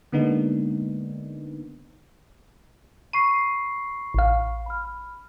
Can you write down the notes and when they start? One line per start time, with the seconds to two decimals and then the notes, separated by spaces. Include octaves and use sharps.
0.12 D3 G#3 A#3 B3 D4 D#4
3.13 B5 C#6 C7 D#7
4.14 A1 F5
4.66 B5 F6